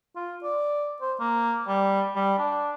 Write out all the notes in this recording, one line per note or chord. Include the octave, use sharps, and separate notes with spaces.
F4
D5
C5
A#3
G3
G3
D4